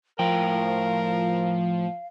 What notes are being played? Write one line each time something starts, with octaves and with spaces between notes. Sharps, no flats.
A2 F3 A#4 F5 G5